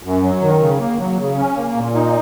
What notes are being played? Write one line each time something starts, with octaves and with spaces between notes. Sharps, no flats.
F#2
F#3
D#3
C#3
A#3
F#3
C#3
C#4
A#3
A#2
D#4